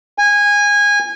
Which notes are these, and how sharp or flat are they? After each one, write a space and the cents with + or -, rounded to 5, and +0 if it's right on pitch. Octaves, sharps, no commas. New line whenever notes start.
G#5 -20